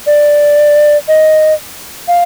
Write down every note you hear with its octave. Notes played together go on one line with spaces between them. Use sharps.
D5
D#5
F5